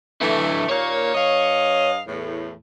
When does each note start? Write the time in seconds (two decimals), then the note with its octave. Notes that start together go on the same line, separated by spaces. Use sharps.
0.21 D3 E3 A3 E4
0.69 D#2 A#2 A#3 C#5
1.14 G2 D#5 F5
2.07 E2 A2